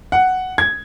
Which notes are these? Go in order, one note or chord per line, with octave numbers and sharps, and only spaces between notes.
F#5
G#6